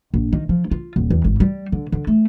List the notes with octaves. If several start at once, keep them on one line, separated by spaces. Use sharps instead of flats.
A#1
D#3
F3
F4
D#1
E2
G#1
G3
D3
D3
A3